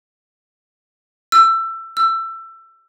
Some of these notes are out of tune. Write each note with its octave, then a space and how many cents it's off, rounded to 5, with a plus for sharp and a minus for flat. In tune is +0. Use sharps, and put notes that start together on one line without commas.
E6 +20
E6 +20